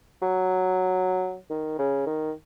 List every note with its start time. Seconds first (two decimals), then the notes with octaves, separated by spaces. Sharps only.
0.22 F#3
1.50 D#3
1.79 C#3
2.06 D#3